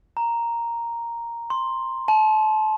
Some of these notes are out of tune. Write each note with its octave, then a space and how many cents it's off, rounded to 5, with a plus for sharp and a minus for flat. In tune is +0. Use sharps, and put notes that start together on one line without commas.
A#5 +0
C6 +10
A5 -30